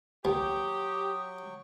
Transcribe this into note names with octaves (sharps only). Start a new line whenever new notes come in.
D#2 F#3 G4 G5 C#6 D#6